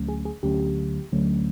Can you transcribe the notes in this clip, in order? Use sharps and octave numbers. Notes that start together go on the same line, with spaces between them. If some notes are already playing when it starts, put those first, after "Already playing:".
Already playing: D2 D3 F#3 A3 C#4
G#4
G#4
D2 D3 F#3 A3 C#4 G4
D2 D3 F#3 A3 C#4